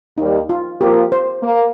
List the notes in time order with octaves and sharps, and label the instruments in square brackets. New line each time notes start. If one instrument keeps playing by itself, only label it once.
[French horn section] D#2 D#3 G3 [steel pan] D#4
[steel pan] F4
[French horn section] F3 A#3 F4 A#4 [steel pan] G4
[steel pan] C5
[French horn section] A#3